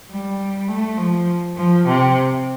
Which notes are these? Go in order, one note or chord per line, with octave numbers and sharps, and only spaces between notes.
G3
A3
F3
F3
C3